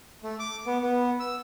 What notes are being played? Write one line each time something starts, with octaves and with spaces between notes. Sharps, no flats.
A3
D6
B3
B3
E6